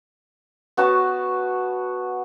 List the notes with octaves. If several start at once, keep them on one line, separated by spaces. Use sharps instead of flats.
B3 F#4 C#5 A5